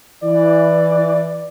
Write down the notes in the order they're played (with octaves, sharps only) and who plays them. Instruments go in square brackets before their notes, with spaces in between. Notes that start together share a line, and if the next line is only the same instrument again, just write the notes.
[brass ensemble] E3 [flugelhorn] D5